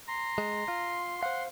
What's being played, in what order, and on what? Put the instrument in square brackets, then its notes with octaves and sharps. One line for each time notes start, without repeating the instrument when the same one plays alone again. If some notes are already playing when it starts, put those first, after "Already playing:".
[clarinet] A#5 [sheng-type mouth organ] C6
[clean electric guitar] G#3
F4
[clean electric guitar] C5 F5 [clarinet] F#5